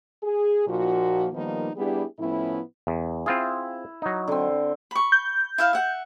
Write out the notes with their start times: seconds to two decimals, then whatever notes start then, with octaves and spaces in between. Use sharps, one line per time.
0.23 G#4
0.67 A#2 F3 A#3 D#4 F#4
1.33 D#3 F3 G3 A#3 B3 D#4
1.77 G3 B3 D4 E4 G4 G#4
2.19 A2 F3 B3 C#4 E4
2.87 E2
3.26 C4 E4 F4 G#4
4.02 F#3 D#4
4.28 D3 C4
4.91 B5 C#6
5.12 G6
5.58 E4 E5 F5
5.73 E5 F#5